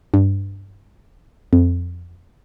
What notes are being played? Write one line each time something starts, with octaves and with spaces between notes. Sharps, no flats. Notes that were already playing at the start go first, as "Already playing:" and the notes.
G2
F2